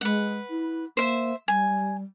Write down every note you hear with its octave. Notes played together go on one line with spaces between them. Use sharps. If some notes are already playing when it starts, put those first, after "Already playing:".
G#3 B4 F#5
E4
A#3 C5 E5
G3 G#5